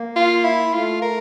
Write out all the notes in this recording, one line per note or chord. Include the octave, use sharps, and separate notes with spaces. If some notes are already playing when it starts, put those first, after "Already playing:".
Already playing: A#3
F4
E4
A3 F4
A#4